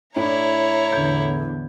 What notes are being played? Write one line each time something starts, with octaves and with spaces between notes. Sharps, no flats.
A2 D4 E4 C#5 A#5
E2 A2 D3 G6 G#6